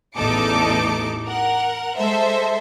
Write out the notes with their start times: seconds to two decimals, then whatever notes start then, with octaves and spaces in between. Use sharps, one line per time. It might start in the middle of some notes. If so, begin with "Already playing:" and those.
0.15 A1 E2 D#4 A4 D6 C#7
1.26 A#4 F#5
1.98 G#3 A4 C5 E5